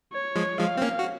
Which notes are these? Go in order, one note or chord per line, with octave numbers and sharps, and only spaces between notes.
C#5
F3 G#3
F3 G#3 F5
C4
A#3 C#4
F#4